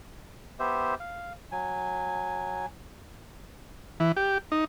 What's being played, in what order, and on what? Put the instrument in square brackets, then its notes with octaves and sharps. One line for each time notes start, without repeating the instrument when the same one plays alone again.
[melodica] B3 G4 C5 E5
F5
F#3 G#5
[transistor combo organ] E3
G4
D#4